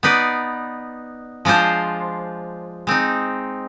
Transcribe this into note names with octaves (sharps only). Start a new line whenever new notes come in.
B3 D#4 B4 D5
F3 G#3 D4 F4 C5
G#3 C4 D#4